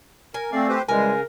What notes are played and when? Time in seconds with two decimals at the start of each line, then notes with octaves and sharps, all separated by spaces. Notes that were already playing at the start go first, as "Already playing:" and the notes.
0.34 A#4 G#5
0.52 A3 C4 D5 F5
0.69 G4 B4 C5
0.89 C#3 E3 G3 G#3 A#4 G#5